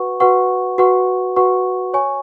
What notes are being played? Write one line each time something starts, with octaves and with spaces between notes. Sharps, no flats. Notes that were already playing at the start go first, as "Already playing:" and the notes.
Already playing: F#4 B4 F#5 C#6
F#4 B4 F#5 C#6
F#4 B4 F#5 C#6
F#4 B4 F#5 C#6
C#5 G#5 C#6